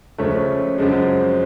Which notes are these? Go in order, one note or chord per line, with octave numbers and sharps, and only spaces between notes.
C#2 C#3 F3 A3 C#4
F#2 C#3 F3 G#3 C4